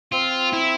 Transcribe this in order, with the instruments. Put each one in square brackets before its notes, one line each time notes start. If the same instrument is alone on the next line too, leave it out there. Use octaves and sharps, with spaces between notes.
[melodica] C4 [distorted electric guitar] F4
[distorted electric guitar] E4